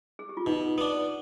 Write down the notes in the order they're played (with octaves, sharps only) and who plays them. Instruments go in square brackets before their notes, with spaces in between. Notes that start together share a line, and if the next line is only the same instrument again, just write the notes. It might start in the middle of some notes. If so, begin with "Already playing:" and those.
[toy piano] G#4
G4
F4
[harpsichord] B2 [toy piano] D#4
[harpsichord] B3 D4